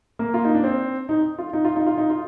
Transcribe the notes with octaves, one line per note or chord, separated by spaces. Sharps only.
A#3
F4
D#4
D4
C4
D#4
F4
D#4
F4
D#4
F4
D#4
F4